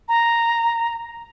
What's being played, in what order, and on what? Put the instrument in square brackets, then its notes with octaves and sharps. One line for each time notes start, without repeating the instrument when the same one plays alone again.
[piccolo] A#5